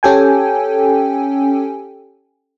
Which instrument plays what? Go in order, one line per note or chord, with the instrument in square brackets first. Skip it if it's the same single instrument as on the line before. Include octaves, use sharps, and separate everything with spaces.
[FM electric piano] C#4 G4 A4 G5 G#5